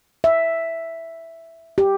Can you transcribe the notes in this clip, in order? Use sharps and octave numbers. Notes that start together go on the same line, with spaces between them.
E5
G4